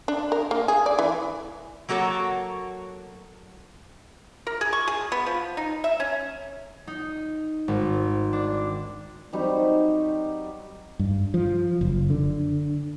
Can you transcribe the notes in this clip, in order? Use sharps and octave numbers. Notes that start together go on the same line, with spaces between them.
D4
A#4
A#3
G#4
D5
E3
F#3 A#3 F#4 A4 C#5
A#4
G#4
C#6
G#4
B3
F3
D#4
E5
C#4
D#4
G#1
D4
F#3 G3 C4 D#4
G2
F3
F#1
D3